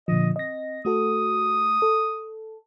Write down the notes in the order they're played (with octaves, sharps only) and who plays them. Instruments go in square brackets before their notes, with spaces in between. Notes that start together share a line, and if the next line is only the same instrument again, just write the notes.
[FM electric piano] A#2 D3 F3 [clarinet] D#5
[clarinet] C4 [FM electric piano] D#5 A#6
[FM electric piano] A3 F#4 A4 [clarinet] D#6
[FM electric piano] A4